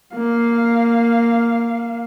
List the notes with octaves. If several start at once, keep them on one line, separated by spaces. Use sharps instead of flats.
A#3 F5